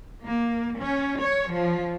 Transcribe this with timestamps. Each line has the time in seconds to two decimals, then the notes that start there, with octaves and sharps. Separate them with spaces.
0.24 A#3
0.79 C#4
1.19 C#5
1.48 F3